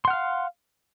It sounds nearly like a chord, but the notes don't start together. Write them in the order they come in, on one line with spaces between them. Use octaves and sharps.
C6 F#5 F6 F5